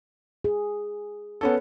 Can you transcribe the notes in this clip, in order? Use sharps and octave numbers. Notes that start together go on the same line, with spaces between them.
G#4
B3 C#4 A4